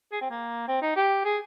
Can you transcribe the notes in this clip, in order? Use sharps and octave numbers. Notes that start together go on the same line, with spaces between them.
G#4
C4
A#3
C4
D#4
G4
G#4